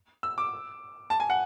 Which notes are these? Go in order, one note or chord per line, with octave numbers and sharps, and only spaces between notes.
E6
D6
A5
G#5
F#5